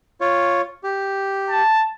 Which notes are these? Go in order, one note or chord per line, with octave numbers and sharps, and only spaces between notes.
F4 C#5
G4
A5